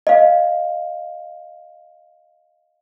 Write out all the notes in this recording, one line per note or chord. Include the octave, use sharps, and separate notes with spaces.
D#5 F5